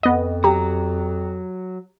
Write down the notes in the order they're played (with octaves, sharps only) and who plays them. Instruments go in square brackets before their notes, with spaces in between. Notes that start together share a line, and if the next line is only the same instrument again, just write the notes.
[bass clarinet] F2 [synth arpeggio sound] B3 D#5
[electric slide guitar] F#3 [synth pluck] G4 A#5